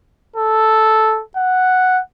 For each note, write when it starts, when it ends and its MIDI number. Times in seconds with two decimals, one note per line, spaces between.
0.37 1.22 69
1.37 2.00 78